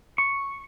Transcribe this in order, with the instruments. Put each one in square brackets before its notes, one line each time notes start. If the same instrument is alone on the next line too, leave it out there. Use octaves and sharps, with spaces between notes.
[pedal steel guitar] C#6